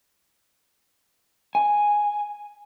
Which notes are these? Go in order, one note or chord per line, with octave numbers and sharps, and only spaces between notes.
G#5